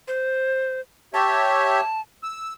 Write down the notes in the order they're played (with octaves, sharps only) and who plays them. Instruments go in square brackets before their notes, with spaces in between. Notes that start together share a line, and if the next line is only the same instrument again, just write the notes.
[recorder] C5
[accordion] G4 C#5 E5 [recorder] A5
[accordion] E6